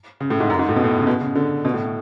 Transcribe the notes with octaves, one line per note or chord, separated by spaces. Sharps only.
C#3
A2
G#2
F#2
G#2
A2
B2
A2
C#3
B2
C#3
D3
B2
A2